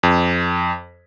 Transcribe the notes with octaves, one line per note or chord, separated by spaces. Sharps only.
F2